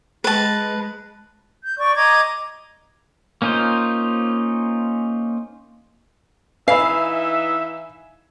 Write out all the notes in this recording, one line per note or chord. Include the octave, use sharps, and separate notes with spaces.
G#3 B4 A5
G6
D5 C#6
D#5 A#5 D6 G#6
A#3 C#4 D#4 F4 C5
E3 D#4 E5 F5 G#5 B5